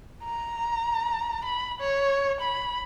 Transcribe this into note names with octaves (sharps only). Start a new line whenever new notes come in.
A#5
B5
C#5
B5